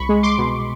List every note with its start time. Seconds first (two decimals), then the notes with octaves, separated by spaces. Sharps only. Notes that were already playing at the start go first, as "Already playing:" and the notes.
Already playing: C2 B5 C#6
0.09 G#3
0.23 C6 D6
0.38 B2